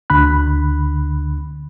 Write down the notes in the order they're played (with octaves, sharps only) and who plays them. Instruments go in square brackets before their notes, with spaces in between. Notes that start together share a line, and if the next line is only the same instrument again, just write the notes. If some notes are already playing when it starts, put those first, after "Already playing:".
[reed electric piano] D2 D3 B5 F#6